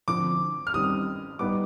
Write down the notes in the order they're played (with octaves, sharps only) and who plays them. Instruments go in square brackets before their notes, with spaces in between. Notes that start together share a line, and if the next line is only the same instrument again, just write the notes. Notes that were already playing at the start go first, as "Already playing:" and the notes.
[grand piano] D3 F3 C4 [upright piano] D6
[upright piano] F6
[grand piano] D#3 G3 C4 G4 [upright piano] D#6
[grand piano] G3 B3 D#4 B4 [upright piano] D6